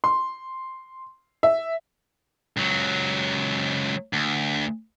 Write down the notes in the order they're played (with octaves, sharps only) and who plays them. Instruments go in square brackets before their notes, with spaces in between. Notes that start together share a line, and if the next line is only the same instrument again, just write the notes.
[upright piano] C6
E5
[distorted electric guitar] C#2 F#3
D2